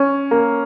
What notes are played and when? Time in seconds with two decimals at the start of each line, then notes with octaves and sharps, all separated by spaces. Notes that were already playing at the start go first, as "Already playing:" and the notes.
Already playing: C#4
0.31 A#3